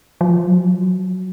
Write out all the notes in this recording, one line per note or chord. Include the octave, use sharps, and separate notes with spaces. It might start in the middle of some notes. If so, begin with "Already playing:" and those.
F3
F#3
F3
F#3